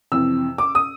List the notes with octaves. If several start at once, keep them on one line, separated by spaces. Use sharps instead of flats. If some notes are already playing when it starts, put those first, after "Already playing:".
F2 C3 E3 E6
D6
D#6